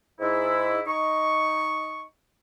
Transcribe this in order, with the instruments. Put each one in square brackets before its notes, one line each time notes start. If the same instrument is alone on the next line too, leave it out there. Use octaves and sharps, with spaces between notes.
[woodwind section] G#2 E4
D#4 C#6